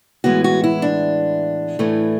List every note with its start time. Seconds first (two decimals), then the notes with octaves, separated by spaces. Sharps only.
0.24 A2 E3 G#3 B3 F#4
0.44 F#4
0.64 E4
0.82 D4
1.79 A2 E3 A3